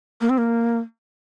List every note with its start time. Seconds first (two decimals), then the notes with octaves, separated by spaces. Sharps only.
0.21 A#3
0.29 C4
0.38 A#3